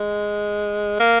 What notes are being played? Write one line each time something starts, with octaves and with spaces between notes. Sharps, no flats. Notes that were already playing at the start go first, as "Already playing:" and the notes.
Already playing: G#3
A#3